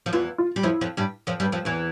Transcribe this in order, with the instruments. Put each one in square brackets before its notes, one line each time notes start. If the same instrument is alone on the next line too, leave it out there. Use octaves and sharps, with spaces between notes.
[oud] F3
[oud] E2 E3 [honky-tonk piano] F4
[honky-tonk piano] F4
[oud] G3
[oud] F2 F3 [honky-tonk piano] E4
[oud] F2 F3
G2 G3
F2 F3
G2 G3
F2 F3
E2 E3